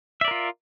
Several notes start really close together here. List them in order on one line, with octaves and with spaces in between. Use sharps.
E5 D5 A#4 F4